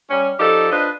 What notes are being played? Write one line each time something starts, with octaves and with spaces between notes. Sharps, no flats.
G3 C#4
F3 D#4 G4 A4 D5
D4 F4 B4 C5 D#5